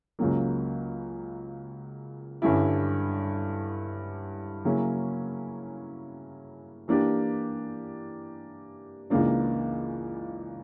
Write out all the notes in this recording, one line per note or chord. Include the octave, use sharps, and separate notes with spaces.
C#2 C#3 F#3 A#3
G2 D3 G3 C#4 E4
C#3 F#3 A#3 C#4 E4
E3 A#3 D4 G4
C#2 C#3 E3 A#3 D4